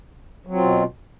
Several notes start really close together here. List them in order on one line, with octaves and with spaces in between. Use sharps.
F#3 C4 F4 B2